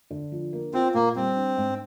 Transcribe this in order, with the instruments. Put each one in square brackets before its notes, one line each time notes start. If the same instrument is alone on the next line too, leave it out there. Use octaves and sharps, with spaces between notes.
[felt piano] D3
F3
A#3
[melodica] C4 [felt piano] F4
[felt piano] A#2 [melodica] A#3
[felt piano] G3 [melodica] C4
[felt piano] D4
G#2